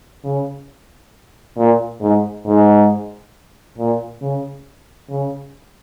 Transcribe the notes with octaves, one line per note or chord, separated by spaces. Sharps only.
C#3
A#2
G#2
G#2
A#2
C#3
C#3